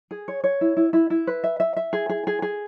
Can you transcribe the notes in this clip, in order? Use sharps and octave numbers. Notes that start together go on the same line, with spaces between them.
G#4
C#5
C#5
E4
E4
E4
E4
B4
E5
E5
E5
G#4
G#4
G#4
G#4